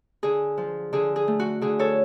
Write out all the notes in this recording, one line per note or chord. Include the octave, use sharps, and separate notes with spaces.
D3 G#4
F3
D3 G#4
G#4
A3
F#4
D3 G#4
A4 C#5